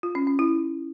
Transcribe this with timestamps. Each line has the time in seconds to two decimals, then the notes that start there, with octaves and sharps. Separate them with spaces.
0.03 F4
0.15 C#4
0.27 C#4
0.39 E4